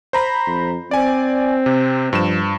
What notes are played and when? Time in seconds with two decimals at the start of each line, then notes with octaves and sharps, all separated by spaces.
0.13 C5 A#5 B5
0.47 F2
0.91 C4 D5 G#5
1.66 C3
2.13 G2 F3 E7